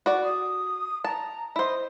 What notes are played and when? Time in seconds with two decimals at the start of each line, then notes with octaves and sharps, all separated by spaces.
0.06 F#4 D5
0.24 D#6
1.04 A5 A#5
1.56 E4 C5 D#5